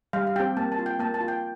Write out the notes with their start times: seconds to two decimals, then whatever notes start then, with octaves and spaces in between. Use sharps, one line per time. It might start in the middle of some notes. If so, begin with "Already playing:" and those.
0.13 G3 F5
0.27 F5
0.36 C4 G4 G5
0.57 A#3 A5
0.72 A5
0.79 F4
0.86 G5
0.99 A#3 A5
1.14 A5
1.21 F4
1.28 G5